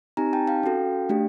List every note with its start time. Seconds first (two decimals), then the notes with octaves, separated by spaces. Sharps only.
0.17 C4 D#4 G4 G#5 A#5
0.33 G5 A5
0.48 F5 G5
0.63 C#4 F#4 A4
1.09 A3 D4 G4